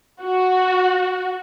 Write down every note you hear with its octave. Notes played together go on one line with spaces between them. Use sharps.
F#4